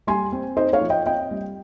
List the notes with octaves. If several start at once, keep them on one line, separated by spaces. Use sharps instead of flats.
G3 G#5 C6
C4
D#4 C5 D#5
C#5 F5
F3
D#5 G5
C4 D#5 G5
G3